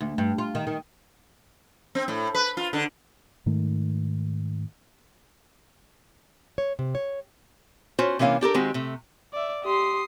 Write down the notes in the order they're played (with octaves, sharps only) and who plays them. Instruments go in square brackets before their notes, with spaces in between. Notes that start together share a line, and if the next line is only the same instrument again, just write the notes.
[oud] D2
G2
F4
D#3
D#3
[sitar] C4
A2
B4
F4
D3
[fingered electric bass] G#2 D#3 A3
[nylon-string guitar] C#5
C3
C#5
[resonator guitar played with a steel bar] C#4 F4 F#4 C5
C3 E3 A#3 C#4 F5
D4 G4 A4 A#4
D#3 G#3 C4 F#4 G4
C3 A3
[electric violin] D5 E5
[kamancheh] G4 C6 [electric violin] D#6 C7